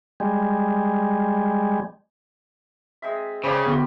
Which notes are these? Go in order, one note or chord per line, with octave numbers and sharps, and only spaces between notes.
G3 G#3
G#3 C4 E5
C#3 C4 G4 B4 C5 D5
D3 G3 B3 C4 F#4